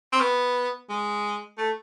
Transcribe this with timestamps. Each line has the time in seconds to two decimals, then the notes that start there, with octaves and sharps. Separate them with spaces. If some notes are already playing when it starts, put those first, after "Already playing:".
0.13 C4
0.21 B3
0.89 G#3
1.58 A3